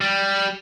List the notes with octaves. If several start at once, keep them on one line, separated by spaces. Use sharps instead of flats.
G3